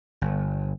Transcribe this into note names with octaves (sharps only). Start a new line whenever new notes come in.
G1